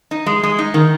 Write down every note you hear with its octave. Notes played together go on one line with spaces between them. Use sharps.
D#4
G#3
G#3
D#4
D#3